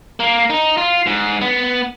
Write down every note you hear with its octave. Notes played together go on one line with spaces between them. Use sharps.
A#3
D#4
F4
G#2
B3